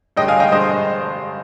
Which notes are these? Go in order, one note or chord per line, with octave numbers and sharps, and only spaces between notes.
G2 D3 G#3 D#5 G5
F5 G#5
D#5 G5
G2 D3 G#3 C5 D#5